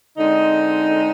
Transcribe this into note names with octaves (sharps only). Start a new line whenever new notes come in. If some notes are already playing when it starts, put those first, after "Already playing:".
D3 G#3 C4 D#4